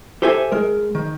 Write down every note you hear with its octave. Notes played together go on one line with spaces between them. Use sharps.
G4 A4 C5 E5 G#5
G#3 A#4
D#3